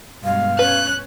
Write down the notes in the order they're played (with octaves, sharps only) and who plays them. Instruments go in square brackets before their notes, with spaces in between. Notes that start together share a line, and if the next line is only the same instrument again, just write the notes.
[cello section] G2 B2 G#3 [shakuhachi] F5
[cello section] C#4 [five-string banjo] B4 [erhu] F#6